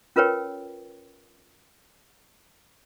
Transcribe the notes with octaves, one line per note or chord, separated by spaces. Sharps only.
C#4 F4 A#4 B4 C#5 G5